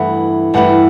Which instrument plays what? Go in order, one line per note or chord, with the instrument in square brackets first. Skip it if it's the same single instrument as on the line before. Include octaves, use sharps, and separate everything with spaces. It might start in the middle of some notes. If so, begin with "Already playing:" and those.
Already playing: [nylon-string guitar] G2 E3 A3 E4 [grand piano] F#5
[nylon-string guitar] G2 E3 A3 E4 [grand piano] F#5